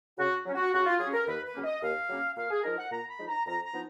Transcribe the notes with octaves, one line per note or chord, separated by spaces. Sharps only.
C#3 F#4
F#3 C#4
F#4
C#3 F#4
F4
F#3 C#4 G#4
A#4
D#2 B4
B4
C#3 F#3 A#3 C#4
D#5
D#2 F5
C#3 F#3 A#3 C#4
A#2 F5
G#4
F3 G#3 D#4 A#4
F#5
A#2 A#5
B5
F3 G#3 D#4
A#5
F2 A#5
A#5
F3 B3 D#4